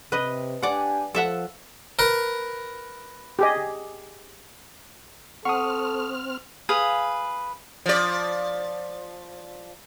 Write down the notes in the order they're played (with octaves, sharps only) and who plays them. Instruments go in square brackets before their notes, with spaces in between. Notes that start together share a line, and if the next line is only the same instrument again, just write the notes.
[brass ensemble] C3 [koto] B4 D#5
[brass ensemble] D4 G4 G#5 [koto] D5 F#5
[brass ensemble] F3 [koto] A4 E5 F#5
[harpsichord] A#4 B4
[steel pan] G4 G#4 D#5
[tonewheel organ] C4 F6 [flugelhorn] A4 [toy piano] F#5 A5 [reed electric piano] C#6 D#6
[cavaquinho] G#4 B4 F5
[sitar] F3 D5